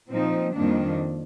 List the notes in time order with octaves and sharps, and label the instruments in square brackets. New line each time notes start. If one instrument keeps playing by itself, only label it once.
[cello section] A#2 F3 C4 D#4
F2 D#3 G3 A#3 D4